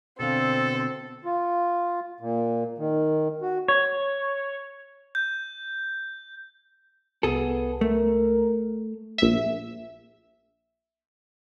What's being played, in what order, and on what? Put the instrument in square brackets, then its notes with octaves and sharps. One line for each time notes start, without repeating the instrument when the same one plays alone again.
[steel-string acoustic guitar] B2 D3 F5 [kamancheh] C4 [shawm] A4
[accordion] F4
A#2
D#3
F#4
[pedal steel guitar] C#5
[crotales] G6
[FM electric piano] C2 [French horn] B3 [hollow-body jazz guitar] G#4 A4
[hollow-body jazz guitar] A3 [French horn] A#4
[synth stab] A#1 E5